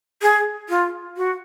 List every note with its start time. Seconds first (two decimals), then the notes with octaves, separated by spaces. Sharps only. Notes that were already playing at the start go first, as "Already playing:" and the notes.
0.22 G#4
0.69 F4
1.17 F#4